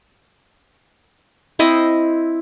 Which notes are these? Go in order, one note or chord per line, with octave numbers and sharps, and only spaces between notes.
C4 E4 D#5